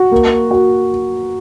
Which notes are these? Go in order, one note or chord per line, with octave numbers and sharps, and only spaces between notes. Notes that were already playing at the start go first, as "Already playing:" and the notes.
Already playing: F#4
A#3
F#4